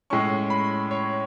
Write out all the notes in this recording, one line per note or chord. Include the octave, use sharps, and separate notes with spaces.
A2 G#3 C#4 C#6
B5
C#5